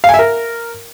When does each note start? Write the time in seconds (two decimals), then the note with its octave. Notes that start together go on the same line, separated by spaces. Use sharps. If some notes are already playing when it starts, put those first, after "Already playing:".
0.04 F5
0.09 G#5
0.14 E5
0.19 A#4